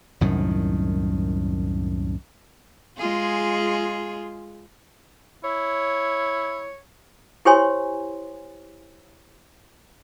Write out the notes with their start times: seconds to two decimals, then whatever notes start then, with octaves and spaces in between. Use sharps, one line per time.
0.21 C2 F#2 A2 D#3
2.97 G#3 F4 G#4
5.44 E4 C#5
7.45 E4 G4 C5 C#5 G#5 C6